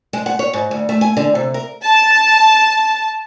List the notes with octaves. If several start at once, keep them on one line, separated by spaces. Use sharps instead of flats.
G#3
F#5
C#5
G#2
D2
A3
G#5
D3
C3
A#4
A5